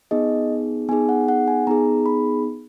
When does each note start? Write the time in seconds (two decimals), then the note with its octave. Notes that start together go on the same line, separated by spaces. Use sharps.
0.11 B3 D#4 G#4 D#5
0.89 B3 D#4 G#4 G#5
1.09 F#5
1.28 F#5
1.48 G#5
1.67 B3 D#4 G#4 A#5
2.06 B5